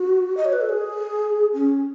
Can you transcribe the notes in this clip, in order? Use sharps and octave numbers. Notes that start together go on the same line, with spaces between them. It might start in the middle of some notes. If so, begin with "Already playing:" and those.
Already playing: F#4
D#5
C#5
B4
A4
G#4
C#4